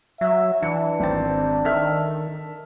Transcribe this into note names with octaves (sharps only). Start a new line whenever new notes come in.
F#3 E5
E3 D4 C#7
G#1 C4 A6
D#3 A4 E5 F6